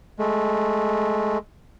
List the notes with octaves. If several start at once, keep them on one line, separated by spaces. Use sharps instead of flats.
G#3 A3